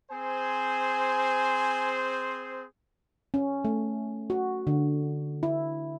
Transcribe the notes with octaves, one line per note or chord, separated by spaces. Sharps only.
C4 G#4 C5 G#5
C#4
A3
F#4
D3
E4